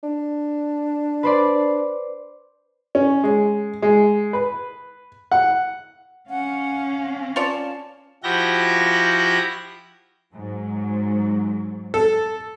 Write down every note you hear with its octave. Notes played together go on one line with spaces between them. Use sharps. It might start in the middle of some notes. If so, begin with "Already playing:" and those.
D4
B4 C5 D5
C#4
G#3
G#3
B4
F#5
C#4 F5 F#5
F4 C#5 D5 A5
F3 E4 F#4 G4 G6 A#6
G#2 F#3
A4